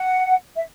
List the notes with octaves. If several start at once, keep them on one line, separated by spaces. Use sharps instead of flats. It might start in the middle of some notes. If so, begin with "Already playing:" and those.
Already playing: F#5
E5